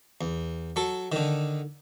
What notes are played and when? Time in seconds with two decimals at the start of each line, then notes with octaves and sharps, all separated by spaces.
0.21 E2
0.76 F#3 A4
1.12 D3 D#3